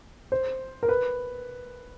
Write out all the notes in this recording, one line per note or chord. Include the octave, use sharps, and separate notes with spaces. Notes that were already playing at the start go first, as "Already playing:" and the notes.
C5
A#4
B4